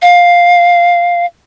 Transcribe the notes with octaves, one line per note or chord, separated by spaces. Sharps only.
F5